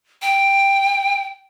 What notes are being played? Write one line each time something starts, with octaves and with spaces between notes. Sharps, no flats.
G5